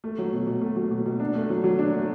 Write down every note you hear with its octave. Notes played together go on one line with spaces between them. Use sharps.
A3
F#3
B2
B2
A3
F#3
B2
B2
D4
A3
F#3
F#3
D4
A3